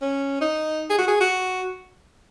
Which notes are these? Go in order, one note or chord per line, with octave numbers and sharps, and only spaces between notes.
C#4
D#4
G#4
F#4
G#4
F#4